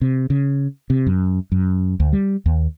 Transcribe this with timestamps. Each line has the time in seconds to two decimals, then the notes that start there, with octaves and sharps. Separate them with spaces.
0.01 C3
0.30 C#3
0.90 C3
1.07 F#2
1.52 F#2
2.00 D2
2.13 G3
2.46 D#2